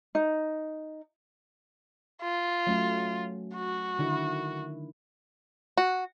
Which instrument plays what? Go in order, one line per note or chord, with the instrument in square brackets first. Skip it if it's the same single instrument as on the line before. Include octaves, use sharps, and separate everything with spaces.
[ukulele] D#4
[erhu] F4
[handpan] F#3 A3 C#4
[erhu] F#4
[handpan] D3 D#3 E4
[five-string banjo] F#4